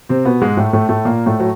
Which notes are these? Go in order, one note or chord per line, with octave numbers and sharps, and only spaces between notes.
C3 C4
B2 B3
G#2 G#3
A2 A3
A2 A3
A2 A3
A#2 A#3
A2 A3
F#3